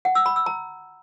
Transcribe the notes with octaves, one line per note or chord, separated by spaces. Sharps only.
F#5
E6
B5
E6
A#5